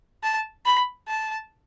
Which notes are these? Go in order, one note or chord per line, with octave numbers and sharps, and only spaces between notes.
A5
B5
A5